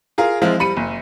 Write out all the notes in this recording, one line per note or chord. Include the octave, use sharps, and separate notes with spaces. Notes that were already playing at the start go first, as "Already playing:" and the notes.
F4 G#4 A#4 F5
F3 G#3 C4 E4 F4
G3 B5 C#7 D#7
F#1